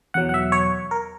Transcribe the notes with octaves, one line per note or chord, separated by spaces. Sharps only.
E2 B2 F#3 F#5
F#5
E5
C#5
A#4